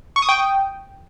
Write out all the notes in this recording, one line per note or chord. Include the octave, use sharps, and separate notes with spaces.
C#6
D#6
G5